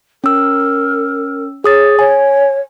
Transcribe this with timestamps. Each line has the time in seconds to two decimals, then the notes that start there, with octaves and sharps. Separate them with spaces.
0.24 C#4 A#4 E6
1.64 G#4 C#5 D#6 A6
1.99 C#5 G#5